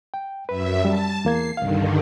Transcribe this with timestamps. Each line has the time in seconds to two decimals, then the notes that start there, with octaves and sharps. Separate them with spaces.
0.14 G5
0.49 F#2 B4 E5
0.85 G3 A5
1.25 E2 A#3 G#6 C7
1.57 C2 G2 D3 D#3 F5